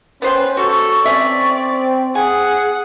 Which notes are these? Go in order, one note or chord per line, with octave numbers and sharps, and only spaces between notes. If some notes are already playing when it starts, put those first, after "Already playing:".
B3 C#4 B4 C5 G5
G3 F#4 A4 C#6
C4 C#4 D5 E5
G#4 F#5 G#5